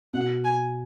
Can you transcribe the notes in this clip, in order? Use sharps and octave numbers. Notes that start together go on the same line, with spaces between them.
B2 F#5
G#5